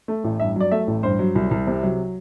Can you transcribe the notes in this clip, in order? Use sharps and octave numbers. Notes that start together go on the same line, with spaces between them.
A3
A1
G2 E5
F#3 D5
A3 E5
A1
G2 C5
F#3
C2
C2
C3
F#3